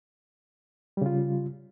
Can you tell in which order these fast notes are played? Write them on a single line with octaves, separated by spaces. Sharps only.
G3 C#3 F4